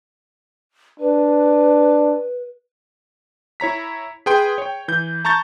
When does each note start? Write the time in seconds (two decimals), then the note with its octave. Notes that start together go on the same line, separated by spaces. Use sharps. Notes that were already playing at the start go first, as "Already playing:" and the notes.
1.00 D4 B4
3.60 E4 C#5 A#5 B6
4.26 G#4 B4 G5 C6
4.58 C#5 G5
4.88 E3 G6
5.25 A5 A#5 C#6 G6 A6